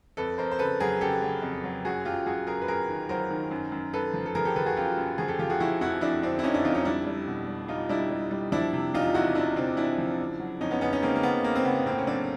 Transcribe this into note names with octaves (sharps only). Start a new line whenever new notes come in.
F2 A4 B4
F2 A#4 C5
C5
C#3 A4 B4
F#3 G#4 A#4
C#3 G4 A4
F#3
F2
F#3
F#2 F#4 G#4
F#2 F4 G4
F#2 F#4 G#4
F#2 G#4 A#4
B4
F#2 G#4 A#4
D#3
F#3 A#4 C5
D#3
F#2
F#2
F#2 A4 B4
F3
A4
F3 G#4 A#4
G4 A4
F3 A4 B4
F#4 G#4
F#2 F4 G4
F#2
F3 F#4 G#4
G4 A4
F3 F4 G4
F#4 G#4
F3 E4 F#4
F2 E4 F#4
F2 D4 E4
D3 C4 D4
E4
F2 C#4 D#4
D4 E4
F2 D#4 F4
C#4 D#4
G3 D4 E4
G3
B2
G3
G3 D#4 F4
G3 D4 E4
G3
G3
F3 D4 E4
C3
E2 D#4 F4
E2 E4 F#4
E2 D4 E4
C3 C4 D4
E2 D4 E4
F3
C#3
F#3
F2 C#4 D#4
B3 C#4
C#3 B3 C#4
C#4 D#4
C#3 A#3 C4
A#3
C#3 B3
C#3 A#3
C4
C#3 B3
A2 A#3 C4
C#4
F#3 C4 D4